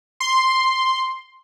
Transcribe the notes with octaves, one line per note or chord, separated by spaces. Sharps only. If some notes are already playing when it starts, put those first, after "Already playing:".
C6